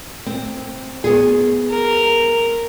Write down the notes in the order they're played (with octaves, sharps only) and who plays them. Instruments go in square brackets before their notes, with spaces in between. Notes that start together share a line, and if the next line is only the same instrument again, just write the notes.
[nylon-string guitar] C4
B3 G#4
[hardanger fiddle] A#4